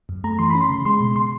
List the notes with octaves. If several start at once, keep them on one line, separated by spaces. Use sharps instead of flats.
F#2
A3 A#5
E3 C6
C#4 B5
C6
C#3
G#3 C6
B2
C6